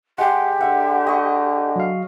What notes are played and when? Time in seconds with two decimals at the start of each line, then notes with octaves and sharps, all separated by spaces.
0.18 G#3 G4 F#5 C6
0.61 D3 E5 F#5
1.07 D#5 C#6
1.76 F#3 F5